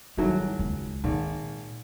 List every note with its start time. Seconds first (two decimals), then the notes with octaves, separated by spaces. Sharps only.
0.17 G#1 F#3 G3 E4
0.59 C#2
1.04 G#1 A#2